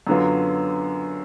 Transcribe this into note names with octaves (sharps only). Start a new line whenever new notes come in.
F#2 D3 F#3 B3 F4